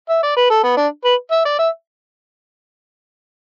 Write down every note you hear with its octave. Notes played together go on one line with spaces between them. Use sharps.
E5
D5
B4
A4
B3
D4
B4
E5
D5
E5